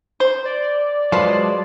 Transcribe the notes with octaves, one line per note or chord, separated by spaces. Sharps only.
C5
D5
F#3 G#3 F4 B4 C5 A5